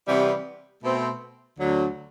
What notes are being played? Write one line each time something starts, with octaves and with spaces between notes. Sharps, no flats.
C3 E3 G3 B3
B2 A3 C4
D2 D3 F#3